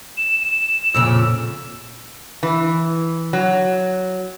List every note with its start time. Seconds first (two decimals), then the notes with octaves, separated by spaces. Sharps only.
0.17 E7
0.42 E7
0.94 F2 A#2 C#3 E6
2.43 E3
3.33 F#3